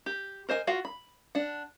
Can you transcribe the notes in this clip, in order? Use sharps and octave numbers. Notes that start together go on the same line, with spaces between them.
G4
A#4 C5 D#5 G#5
F4 F#4 F5
B5
D4 F#5